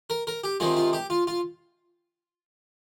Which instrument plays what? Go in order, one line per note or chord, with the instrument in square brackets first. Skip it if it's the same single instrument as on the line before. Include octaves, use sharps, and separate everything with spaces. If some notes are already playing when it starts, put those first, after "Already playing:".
[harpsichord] A#4
A#4
G4
C3 D#3 G#3 F4
F4
G4
F4
F4